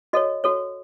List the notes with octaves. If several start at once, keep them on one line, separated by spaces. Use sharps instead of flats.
F#4 A4 C#5 D#5
F#4 A4 C#5